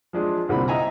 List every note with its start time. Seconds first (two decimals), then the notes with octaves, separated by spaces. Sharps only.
0.13 F3 G#3 D4 F4
0.49 C2 A#2 D3 C4 E4 B5
0.68 D#5 E5 G#5 A#5